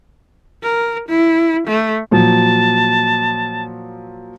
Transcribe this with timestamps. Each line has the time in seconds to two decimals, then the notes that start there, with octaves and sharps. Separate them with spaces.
0.63 A#4
1.09 E4
1.67 A3
2.11 A#2 F3 F#3 A5